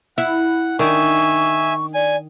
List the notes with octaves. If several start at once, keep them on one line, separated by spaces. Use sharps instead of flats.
E4 F#5
D#3 D4 E5 G#5 C#6
D5 G#5